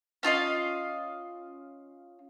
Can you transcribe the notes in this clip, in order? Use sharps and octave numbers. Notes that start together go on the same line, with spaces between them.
C#4 F4 D#5 F5